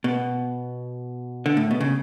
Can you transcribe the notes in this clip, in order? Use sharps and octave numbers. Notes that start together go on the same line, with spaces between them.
B2
D3
A2
B2
C#3